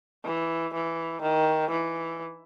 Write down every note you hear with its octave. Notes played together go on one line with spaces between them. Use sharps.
E3
E3
D#3
E3